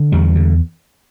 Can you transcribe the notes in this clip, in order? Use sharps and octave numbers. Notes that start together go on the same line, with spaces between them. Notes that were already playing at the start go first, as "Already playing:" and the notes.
Already playing: D3
E2 G3
D3